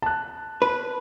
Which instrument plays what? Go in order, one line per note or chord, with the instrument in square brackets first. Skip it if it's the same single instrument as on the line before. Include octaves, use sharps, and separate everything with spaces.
[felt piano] A5 F#6
[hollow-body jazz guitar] B4